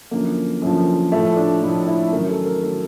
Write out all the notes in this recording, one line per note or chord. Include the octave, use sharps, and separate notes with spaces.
F#2 D3 F3 A#3
F#2 D3 F3
A2 F3 A3
D4
A2 F3 D#4
E4
F#2 D#3 F#3 A#4
A4
A#4
D#3 F#3 A4